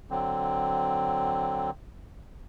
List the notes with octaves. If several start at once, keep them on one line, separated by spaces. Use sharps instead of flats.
D3 F#3 C4